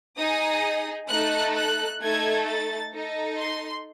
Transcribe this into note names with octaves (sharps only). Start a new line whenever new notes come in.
D#4 G#4 D#6
A3 D#4 A4 F#6
F#6
A3 D#4 A4 G#6
A6
D#4 A4
C6